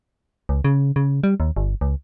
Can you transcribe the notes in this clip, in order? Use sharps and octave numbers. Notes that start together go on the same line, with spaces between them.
C#2
C#3
C#3
G3
D#2
G1
C#2